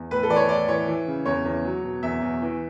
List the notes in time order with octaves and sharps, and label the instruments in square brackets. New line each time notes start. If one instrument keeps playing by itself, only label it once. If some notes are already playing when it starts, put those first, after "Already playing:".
Already playing: [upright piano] E2
A2 B4
A4
E3 D5
C#5
A2 D5
E3 C#5
E3
C#3
E2 C#5
E2
F#3
B2
E2 E5
E2
E3